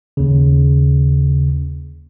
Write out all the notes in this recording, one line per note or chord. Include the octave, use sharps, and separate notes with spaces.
D#2 C#3